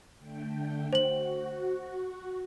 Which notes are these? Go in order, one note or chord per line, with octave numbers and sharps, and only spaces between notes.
D3 A3 G5
F#4 C5 F#7